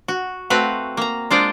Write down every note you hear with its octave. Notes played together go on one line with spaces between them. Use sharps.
F#4
A3 C4 F#4 B4 F5
A#3 A#5
G#3 D4 F4 C5 D5 D#5